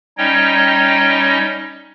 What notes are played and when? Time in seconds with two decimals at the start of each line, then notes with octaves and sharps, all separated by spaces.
0.18 G3 C#4 D#4 C#5 D#5 G5